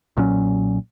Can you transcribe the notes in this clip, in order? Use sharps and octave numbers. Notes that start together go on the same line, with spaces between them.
B1 A#2 F#3 C#4